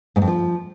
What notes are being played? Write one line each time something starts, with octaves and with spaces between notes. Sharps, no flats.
G#2
F2
F3